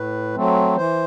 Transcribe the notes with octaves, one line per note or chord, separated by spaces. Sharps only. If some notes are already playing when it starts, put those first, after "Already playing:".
Already playing: A2 B4
F#3 A3 C4
E3 C5